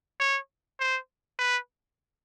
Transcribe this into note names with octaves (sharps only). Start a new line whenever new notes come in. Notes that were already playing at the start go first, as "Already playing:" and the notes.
C#5
C5
B4